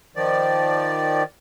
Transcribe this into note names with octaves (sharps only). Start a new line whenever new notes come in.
D#3 F3 D5